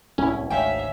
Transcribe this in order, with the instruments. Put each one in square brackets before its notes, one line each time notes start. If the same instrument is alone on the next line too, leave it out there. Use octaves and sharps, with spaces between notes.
[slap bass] D1 C2 [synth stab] C#4 E4
[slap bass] G#1 D2 G#2 [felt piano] C#5 F5 G#5 [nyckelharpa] E5 [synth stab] G5